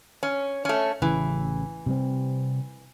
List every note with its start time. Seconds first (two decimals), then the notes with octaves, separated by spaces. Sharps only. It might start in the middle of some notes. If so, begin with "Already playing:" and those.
0.23 C#4
0.65 A3 C#4
1.02 A1 C#3 E3
1.86 C3 G3 C4